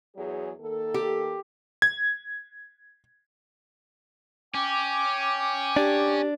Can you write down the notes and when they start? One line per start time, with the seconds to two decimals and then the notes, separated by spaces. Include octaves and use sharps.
0.17 E2 F#3 G#4
0.61 D#3 A#3 A4
0.94 G4
1.82 G#6
4.54 C#4 G5 D6
5.77 D4 G4